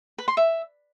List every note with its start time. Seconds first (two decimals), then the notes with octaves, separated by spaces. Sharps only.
0.18 B4
0.28 C6
0.37 E5